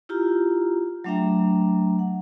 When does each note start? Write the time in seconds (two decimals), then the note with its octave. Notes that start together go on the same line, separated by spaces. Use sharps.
0.09 E4 F4 G4 A#5
1.04 F#3 A3 D4 E5 G5 A#5
1.99 F#5